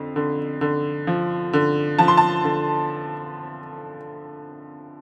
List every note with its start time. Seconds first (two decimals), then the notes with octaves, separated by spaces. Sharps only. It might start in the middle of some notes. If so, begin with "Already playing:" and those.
Already playing: F2 D3
0.16 D3
0.61 D3
1.07 F3
1.53 D3
1.98 F3 A5
2.08 C6
2.18 A5
2.44 D3